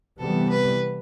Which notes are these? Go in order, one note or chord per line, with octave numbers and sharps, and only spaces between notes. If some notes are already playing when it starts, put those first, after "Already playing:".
C3 E3 G3 B3 A4
B4